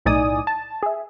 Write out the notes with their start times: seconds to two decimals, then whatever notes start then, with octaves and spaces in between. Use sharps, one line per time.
0.05 B1 A2 D#4 D5 G#5 D#6
0.47 A5
0.83 G#4 E5